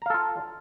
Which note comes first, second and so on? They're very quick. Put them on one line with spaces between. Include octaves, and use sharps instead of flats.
A#5 F5 A4 F4